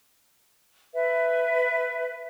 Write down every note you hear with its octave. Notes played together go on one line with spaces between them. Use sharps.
B4 E5